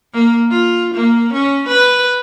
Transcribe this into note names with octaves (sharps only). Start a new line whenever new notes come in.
A#3
F4
A#3
C#4
B4